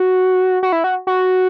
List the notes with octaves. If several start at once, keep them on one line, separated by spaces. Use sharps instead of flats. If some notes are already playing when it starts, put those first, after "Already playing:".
Already playing: F#4
F#4
E4
F#4
F#4